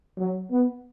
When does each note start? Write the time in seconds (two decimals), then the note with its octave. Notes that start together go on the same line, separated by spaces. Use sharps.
0.17 F#3
0.51 B3